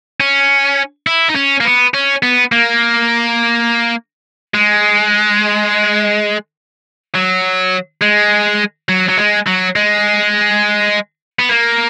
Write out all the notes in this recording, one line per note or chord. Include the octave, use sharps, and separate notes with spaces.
C#4
E4
D#4
C#4
A#3
B3
C#4
B3
A#3
G#3
F#3
G#3
F#3
F#3
G#3
F#3
G#3
B3
A#3